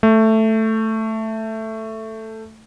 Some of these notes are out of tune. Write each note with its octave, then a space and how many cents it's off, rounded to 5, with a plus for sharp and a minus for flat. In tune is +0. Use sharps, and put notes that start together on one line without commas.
A3 +5